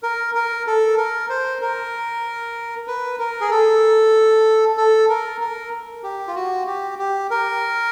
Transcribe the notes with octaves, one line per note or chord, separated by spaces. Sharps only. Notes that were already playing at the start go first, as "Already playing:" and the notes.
A#4
A#4
A4
A#4
C5
A#4
B4
A#4
G#4
A4
A4
A#4
A#4
G4
F4
F#4
G4
G4
A#4